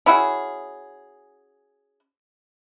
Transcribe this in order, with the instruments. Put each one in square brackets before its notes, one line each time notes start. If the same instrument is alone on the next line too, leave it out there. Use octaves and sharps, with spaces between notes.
[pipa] C#4 E4 F#4 G#4